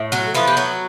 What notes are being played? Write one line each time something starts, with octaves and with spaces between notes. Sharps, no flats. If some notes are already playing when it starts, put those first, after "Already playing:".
Already playing: A2
F#3 F#4
E3 F3 B3 F4
G4
F#3 F#4